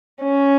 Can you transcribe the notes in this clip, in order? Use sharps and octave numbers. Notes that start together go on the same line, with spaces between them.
C#4